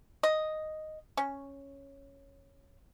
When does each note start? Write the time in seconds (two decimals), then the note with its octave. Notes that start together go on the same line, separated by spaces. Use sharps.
0.23 D#5
1.17 C#4